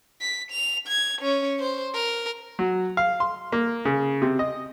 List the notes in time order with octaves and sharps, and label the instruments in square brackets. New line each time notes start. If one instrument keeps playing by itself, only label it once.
[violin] B6
F7
G#6
C#4
C5
A#4
[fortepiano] F#3
F5
C6
A#3
C#3
C3
D#5